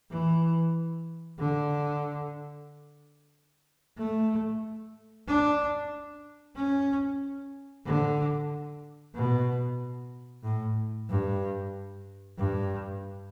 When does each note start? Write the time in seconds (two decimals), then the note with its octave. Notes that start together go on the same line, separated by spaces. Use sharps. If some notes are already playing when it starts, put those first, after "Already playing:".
0.10 E3
1.39 D3
3.98 A3
5.27 D4
6.55 C#4
7.85 D3
9.14 B2
10.43 A2
11.09 G2
12.37 G2